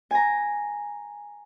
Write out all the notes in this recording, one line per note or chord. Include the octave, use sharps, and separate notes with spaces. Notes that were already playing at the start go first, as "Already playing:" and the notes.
G#5 A#5